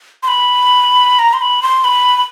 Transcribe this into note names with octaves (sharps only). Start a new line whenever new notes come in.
C6
B5
A#5
C6
B5
C6
B5
B5